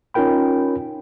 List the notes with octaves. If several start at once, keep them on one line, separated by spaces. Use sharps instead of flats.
C#4 D#4 F4 A#4 G5 B5